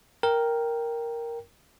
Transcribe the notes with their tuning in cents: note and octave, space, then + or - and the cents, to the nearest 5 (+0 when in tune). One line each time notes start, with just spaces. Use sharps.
A#4 +0 G5 +0